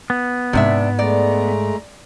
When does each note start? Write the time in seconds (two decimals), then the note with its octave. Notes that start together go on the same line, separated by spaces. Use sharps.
0.10 B3
0.53 G#2 C3 D4 E5
0.99 G#3 A3 D5 A#5